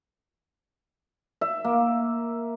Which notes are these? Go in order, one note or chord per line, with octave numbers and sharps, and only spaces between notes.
E5
A#3